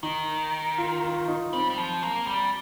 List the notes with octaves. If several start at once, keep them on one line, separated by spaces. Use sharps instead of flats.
D#3 D#4
F4
F4
D#4
G3 C4
G3
F3
A#3
G3